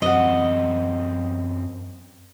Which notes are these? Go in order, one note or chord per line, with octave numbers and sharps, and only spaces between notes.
F#2 C4 D#5 F#5